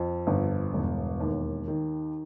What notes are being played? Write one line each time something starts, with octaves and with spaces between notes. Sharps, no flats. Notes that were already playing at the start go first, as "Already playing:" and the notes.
Already playing: F2
G1
E1
D#2
D#3